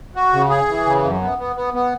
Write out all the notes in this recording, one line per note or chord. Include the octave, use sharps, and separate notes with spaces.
F#4
C#3
G#4
E3
C#3
F#2
B3
B3
B3
B3